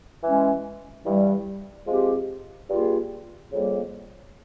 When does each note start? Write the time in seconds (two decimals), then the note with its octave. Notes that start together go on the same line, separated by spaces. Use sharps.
0.23 E3 G#3 C#4
1.05 G2 E3 G3
1.87 F3 G#3 C4 G4
2.70 G2 G3 A#3 F4 G#4
3.51 F2 C#3 G3 A#3